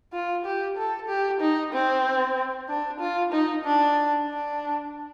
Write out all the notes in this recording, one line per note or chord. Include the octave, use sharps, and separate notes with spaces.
F4
G4
A4
G4
D#4
C4
D4
F4
D#4
D4
D4